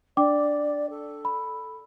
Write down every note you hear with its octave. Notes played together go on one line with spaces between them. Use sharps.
D4 D5 G5 D6
A4
B5